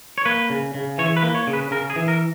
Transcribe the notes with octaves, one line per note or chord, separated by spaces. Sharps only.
C#5
A#3 B4
C#3
C#3
E3 C#5
B4
A#3
C#5
C#3
B4
C#3 A#4
G#4
E3
A#4